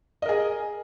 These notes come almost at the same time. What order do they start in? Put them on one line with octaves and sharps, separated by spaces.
D#5 A#4 G#4